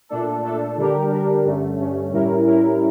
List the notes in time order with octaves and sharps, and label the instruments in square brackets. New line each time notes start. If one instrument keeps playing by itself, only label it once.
[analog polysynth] A#2 A3 D4 A4
A#2 A3 D4 A4
D3 G3 D4 G4 A#4
D3 G3 D4 G4 A#4
G2 D3 A3 C#4
G2 D3 A3 C#4
A2 G3 C#4 E4 A#4
A2 G3 C#4 E4 A#4